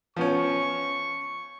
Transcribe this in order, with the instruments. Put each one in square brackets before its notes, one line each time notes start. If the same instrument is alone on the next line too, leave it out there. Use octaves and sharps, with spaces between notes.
[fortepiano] F3 B3 C#4 [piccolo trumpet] C#6